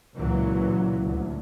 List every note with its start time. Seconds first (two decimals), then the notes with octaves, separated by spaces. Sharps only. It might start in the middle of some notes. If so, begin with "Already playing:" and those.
0.13 C#2 A#2 E3 F#3
1.05 D2